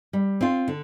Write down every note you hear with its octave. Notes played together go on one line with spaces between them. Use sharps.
G3
C4 F4
D3